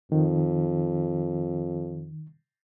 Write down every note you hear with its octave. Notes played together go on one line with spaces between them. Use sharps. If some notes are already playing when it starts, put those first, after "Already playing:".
F2 D#3